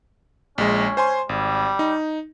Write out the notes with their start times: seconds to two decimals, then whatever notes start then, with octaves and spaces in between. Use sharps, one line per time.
0.58 A#1 G#3 C#4
0.97 C5 G#5 C6
1.29 G#1 G3
1.79 D#4